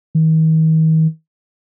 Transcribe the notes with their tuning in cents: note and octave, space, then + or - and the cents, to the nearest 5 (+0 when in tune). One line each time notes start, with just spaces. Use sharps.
D#3 +40